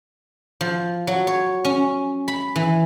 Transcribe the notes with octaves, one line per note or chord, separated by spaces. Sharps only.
F3
F#3
C#5
C#4
B5
E3